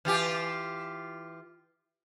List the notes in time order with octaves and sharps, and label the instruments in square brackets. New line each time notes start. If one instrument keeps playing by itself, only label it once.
[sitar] E3 F4 G4